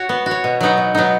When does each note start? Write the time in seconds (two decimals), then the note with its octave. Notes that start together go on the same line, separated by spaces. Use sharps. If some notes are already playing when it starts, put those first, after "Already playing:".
Already playing: F#4 C#5
0.09 B3
0.26 F#4
0.31 C#5
0.44 B2
0.61 F#3 B3 D#4
0.77 B2
0.95 F#3 B3 D#4